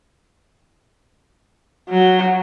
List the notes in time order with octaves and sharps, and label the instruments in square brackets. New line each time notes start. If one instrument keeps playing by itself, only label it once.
[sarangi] F#3